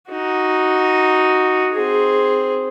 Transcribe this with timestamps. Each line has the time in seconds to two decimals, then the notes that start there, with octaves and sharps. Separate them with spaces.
0.11 D#4 F#4
1.73 C4 G#4